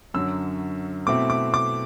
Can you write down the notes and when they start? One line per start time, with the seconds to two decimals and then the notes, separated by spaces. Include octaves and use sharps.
0.14 F#2 D3 F#3 E6
1.07 B2 A3 C4 E4 D6
1.30 D6
1.54 D6